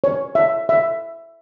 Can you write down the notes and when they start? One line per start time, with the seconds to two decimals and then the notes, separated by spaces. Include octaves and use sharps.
0.04 C#5
0.35 E5
0.69 E5